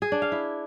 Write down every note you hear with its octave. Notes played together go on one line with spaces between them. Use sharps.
G#4
D4
F5
E4